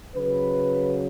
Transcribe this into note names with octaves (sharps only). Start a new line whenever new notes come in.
C#3 F#3 B4